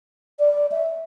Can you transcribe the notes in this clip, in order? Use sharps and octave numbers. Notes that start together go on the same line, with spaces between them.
D5
E5